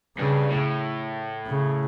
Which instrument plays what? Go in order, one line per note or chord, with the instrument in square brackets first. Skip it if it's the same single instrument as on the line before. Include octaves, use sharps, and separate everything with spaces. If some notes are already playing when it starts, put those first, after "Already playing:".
[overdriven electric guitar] G2 [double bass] C#3
[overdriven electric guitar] A2
[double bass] C#3